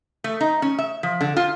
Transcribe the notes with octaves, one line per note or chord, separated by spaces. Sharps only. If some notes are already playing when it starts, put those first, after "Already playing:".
A3
D#4
C#4
E5
F3
D3
F4